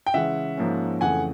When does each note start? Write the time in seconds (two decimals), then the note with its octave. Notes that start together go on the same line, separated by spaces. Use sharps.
0.07 G5
0.14 C#3 E3 G#3 C#4 E5 F#5
0.58 G#2 F3 A#3 C#4
1.01 F2 C#3 E3 A3 F#5 G#5